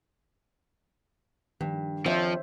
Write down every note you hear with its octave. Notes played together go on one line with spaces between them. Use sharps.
G2 D#3 F3
F2 F3 C5 C#5 E5